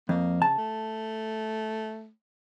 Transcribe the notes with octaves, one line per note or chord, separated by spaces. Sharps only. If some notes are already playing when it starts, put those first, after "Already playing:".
F2 A#3
C#3 A5
A3